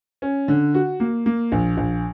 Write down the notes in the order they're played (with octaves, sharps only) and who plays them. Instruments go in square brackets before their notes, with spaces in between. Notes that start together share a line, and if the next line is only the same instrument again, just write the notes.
[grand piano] C#4
D3
F#4
A#3
A#3
A#1
A#1